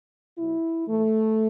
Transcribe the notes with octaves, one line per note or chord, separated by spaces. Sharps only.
B2 F#3 E4
A2 E3 A3